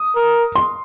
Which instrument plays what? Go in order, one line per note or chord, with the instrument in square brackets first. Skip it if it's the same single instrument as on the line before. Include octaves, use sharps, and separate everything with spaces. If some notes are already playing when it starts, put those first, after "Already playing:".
Already playing: [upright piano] D#6
[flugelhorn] A#4
[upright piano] C6